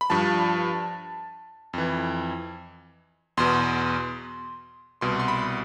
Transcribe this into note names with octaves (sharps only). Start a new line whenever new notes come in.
B5
G2 F3 A5
F2 E3
E2 B2 C6
C2 B2 C6
C6
B5